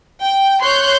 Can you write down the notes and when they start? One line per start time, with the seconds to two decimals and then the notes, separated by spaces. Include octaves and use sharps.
0.22 G5
0.61 C#5 C6 F#6 G6